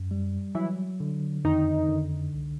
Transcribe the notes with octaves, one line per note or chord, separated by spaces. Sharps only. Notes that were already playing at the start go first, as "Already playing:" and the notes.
Already playing: F#2
G3
E3 F#3 E4
D3
F2 D#3 D#4
D3
C2